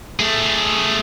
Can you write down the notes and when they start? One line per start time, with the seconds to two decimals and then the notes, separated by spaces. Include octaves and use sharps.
0.19 A3 G#4